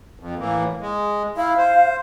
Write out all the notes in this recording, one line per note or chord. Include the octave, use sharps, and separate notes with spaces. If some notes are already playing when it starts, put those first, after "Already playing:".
F2
A2 E3 A#3
G#3
E4 F5
C5